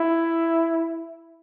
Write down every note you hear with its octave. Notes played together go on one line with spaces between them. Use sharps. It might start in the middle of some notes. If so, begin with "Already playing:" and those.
Already playing: E4